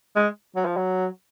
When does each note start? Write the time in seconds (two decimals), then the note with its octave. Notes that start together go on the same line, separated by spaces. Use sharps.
0.16 G#3
0.56 F#3
0.66 F3
0.77 F#3